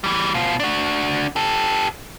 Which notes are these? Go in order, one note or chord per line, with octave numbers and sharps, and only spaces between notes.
E3 G3
B2 F4
D4 F#4
G4 A4